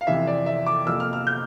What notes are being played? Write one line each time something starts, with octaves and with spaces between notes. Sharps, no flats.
F5
F2 C3 E3 E5
D5
E5
D6
F2 C3 F3 A#3 E6
F6
F6
G6